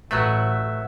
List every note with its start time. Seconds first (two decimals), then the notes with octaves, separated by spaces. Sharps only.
0.11 A1 F#3 A3 B4 E5 F#5